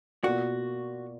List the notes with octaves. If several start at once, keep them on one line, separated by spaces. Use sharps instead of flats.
B2 A#3 F4 F#4 A#4 D5